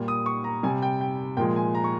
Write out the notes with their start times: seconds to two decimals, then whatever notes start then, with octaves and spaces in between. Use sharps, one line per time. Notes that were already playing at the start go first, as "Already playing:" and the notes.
Already playing: A#2 G3
0.08 D#6
0.26 C#6
0.44 A#5
0.63 C3 G3 G#5
0.82 G5
1.01 G5
1.37 A#2 F3 G#3 G5
1.56 G#5
1.75 A#5
1.84 C#6